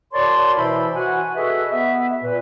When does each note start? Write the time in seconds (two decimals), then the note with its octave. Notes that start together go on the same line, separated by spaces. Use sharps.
0.12 F#4 A#4 C#5 D5 A5 C6
0.56 B2 E3 E4 C5 E5 B5
0.95 F#4 F#5 G#5
1.35 F#4 G#4 A4 B4 D#5 E5
1.71 B3 E5
2.23 A#2 B4